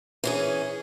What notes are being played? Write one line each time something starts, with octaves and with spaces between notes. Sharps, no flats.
E3 C#4 G#4